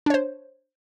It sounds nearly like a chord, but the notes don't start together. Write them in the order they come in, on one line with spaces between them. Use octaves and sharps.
D4 C#5 C5